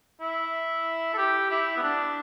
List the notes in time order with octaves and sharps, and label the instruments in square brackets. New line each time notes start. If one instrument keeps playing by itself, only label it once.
[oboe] E4
A4
G4
E4
B3
D4